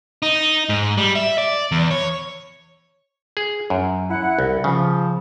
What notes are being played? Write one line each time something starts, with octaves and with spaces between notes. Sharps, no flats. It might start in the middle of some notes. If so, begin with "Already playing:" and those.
D#4
G#2
G3
E5
D5
E2
C#5
G#4
F#2
E4 F#5
C2
C#3 F3